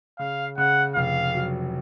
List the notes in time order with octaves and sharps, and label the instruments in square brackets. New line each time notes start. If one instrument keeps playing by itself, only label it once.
[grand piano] C#3 [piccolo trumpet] F5
[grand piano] C#3 [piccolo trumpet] F#5
[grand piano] F1 [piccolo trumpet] F5
[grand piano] F#3